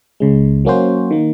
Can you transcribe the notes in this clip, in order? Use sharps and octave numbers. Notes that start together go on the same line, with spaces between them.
C#2 C#3 G#3
F#3 A#3 C#4 F#4 C5
D#3 A#3